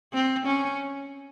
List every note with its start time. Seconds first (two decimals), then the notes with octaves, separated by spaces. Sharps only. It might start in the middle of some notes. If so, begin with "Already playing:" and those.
0.13 C4
0.46 C#4